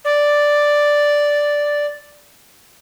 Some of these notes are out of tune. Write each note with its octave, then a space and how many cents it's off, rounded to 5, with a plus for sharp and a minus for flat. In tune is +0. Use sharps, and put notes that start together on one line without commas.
D5 +0